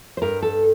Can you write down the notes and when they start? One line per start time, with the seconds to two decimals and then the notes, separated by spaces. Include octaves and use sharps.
0.17 C5
0.22 G2 A#4
0.42 A4